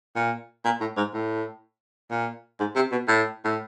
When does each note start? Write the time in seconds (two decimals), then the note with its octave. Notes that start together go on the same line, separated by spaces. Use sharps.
0.16 A#2
0.65 A#2
0.81 A2
0.97 G#2
1.14 A2
2.11 A#2
2.60 G#2
2.76 C3
2.92 B2
3.08 A2
3.45 A2